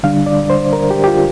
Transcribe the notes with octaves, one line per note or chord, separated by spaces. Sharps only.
D3 G3 D4 F5
D5
C5
A#4
G4
G4
F4